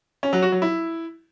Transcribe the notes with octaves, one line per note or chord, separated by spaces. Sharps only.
C#4
F#3
F#4
F#3
E4